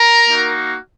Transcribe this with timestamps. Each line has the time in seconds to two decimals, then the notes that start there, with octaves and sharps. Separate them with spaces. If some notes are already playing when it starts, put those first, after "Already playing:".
Already playing: A#4 A#5
0.28 A#3 D#4 F#4